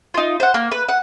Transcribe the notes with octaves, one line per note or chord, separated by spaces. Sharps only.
D#4 F4
C5 F#5
A#3
B4
F#5